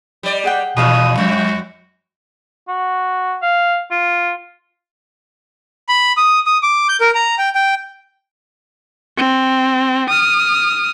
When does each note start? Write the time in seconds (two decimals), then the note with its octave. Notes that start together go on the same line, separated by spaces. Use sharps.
0.23 G3 D5
0.44 G#4 F#5 G5
0.77 D#2 B2 G#4 C5 F5 D#6
1.18 F2 G#3 F#4
2.68 F#4
3.42 F5
3.91 F4
5.89 B5
6.17 D#6
6.46 D#6
6.63 D6
6.89 G6
7.01 A#4
7.15 A#5
7.38 G5
7.55 G5
9.17 C4
10.09 D#6 F6